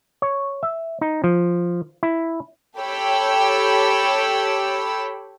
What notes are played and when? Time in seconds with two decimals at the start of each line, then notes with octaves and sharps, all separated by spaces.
0.22 C#5
0.63 E5
1.01 D#4
1.24 F3
2.03 E4
2.79 G4 A4 C#5 G5 B5 E6